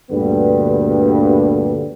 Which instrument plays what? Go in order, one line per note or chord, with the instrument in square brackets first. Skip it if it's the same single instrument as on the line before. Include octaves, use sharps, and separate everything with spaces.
[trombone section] D2 G2 A#2 D3 G3 B3